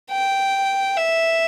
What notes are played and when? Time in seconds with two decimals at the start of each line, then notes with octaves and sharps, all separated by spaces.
0.11 G5
0.97 E5